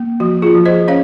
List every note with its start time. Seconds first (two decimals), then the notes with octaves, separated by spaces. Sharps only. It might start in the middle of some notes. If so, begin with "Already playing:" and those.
Already playing: A#3
0.20 F3 F#4
0.42 F4 G#4
0.55 F3
0.66 C5 D#5
0.88 C#4 C#5 F5